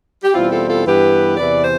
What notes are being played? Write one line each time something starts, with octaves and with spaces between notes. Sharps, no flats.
G4
E2 B2 G3 C4 E4 F4
F4 A4
F4 A4
G2 E3 B3 E4 G4 B4
E2 C3 E3 B4 D5
C5